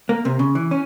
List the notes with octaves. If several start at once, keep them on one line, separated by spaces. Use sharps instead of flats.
A#3
C3
C#3
E3
C#4